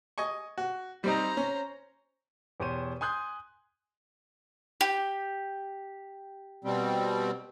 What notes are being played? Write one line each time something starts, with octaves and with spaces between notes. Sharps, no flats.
D#5 G#5 C#6
F#4
G3 C4 D#4 C5 A#5
C#4
E2 B2 G4 C5 C#5 D#7
G#5 C6 D#6 F#6 G6
G4
B2 G3 C4